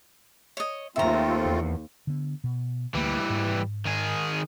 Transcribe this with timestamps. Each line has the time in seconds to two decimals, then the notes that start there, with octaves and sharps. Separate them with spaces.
0.57 C#5 D#5
0.96 D#2 A3 C4 F4 E5 A#5
1.46 E2
2.07 D3 B3
2.44 B2
2.94 D2 E3 G3 A#3
3.30 G#2
3.85 D#3 G#4